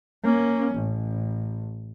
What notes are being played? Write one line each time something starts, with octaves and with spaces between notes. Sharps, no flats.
A#3 C#4
A1